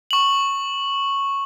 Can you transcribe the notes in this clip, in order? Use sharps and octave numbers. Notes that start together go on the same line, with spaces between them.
C#6 F#7